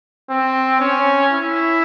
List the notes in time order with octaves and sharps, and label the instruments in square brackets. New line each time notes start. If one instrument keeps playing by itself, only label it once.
[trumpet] C4
C#4
E4